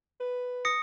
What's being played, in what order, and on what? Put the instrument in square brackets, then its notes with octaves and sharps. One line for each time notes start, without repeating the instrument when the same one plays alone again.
[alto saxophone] B4
[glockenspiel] D#6 A#6 C#7